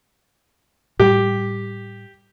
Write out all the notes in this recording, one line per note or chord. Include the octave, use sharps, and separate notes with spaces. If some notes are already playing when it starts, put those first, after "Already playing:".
A2 G3 G4